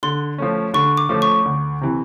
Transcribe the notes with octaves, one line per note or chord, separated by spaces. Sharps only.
D3 C6
F3 A3 C#4
D3 C#6
D6
F3 A3 C#4
C#6
D2
C3 E3